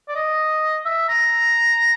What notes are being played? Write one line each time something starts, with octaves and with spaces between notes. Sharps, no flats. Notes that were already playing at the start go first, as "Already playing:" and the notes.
D5
D#5
E5
A#5